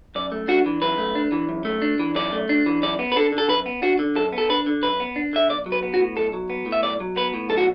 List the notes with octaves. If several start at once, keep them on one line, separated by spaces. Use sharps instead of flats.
F#2 D5
A3
D4 F#4
E3
F#2 B4
A3
D4
E3
F#2
A3
D4
E3
F#2 D5
A3
D4
E3
F#2 D5
B3
B4
D4 A4
D3
A4
F#2 B4
B3
D4 F#4
D3
F#2 A4
B3
A4
D4 B4
D3
F#2 B4
B3
D4
D3 E5
B1 D5
F#3
B4
B3
F#4
A2
B1 A4
F#3
B3
A2
E5
B1 D5
F#3
B3 B4
A2
B1 A4
F#4